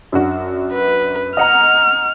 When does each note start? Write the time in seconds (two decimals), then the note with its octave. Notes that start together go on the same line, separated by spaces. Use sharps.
0.12 F#2 D4 F#4
0.74 B4
1.37 D#5 F#5 A#5 F6